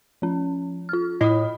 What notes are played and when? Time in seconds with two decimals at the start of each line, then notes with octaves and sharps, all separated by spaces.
0.22 F3 C#4
0.89 F4 F6
1.21 A2 D#5 B5 D#6